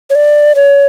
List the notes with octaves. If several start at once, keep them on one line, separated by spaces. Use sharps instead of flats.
C#5
D5
C#5